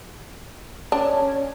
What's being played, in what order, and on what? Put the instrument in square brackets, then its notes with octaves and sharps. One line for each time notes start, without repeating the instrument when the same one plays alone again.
[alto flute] C#4 [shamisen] D4